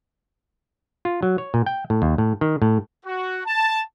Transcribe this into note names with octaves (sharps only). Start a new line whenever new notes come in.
F4
F#3
C#5
A#2
G5
A2
D#2
A2
D#3
A2
F#4
A5